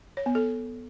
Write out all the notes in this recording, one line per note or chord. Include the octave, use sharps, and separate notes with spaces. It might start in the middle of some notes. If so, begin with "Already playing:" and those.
C#5
B3
A4